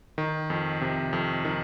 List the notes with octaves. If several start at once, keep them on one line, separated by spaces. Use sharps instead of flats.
D#3
F2
C3
F2
D#3